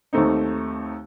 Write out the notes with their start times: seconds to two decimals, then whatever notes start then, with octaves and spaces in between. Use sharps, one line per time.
0.13 D#2 D#3 A3 C4 D#4